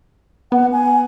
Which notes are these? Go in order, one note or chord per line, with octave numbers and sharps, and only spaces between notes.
B3 F#5
G#5